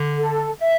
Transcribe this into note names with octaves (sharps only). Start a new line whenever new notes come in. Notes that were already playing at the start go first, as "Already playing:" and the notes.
Already playing: D3
A4
E5